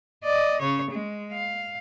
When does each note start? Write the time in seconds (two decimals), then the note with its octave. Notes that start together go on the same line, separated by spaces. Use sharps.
0.24 D5 D#5
0.61 C#3 C#5
0.91 G#3
1.32 F5